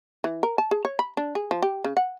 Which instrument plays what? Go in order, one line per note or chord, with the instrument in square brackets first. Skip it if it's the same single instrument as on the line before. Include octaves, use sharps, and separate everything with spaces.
[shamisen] E3
A#4
A5
G#4
C#5
B5
D4
G#4
F3
G4
C#3
F#5